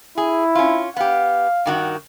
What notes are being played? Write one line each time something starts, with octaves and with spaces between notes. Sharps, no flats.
E4 G#4
C#4 F4
B3 G4 F5
G2 D#3 F#4